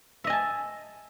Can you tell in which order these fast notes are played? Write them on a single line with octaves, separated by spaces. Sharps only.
E5 D#5 G#5 A5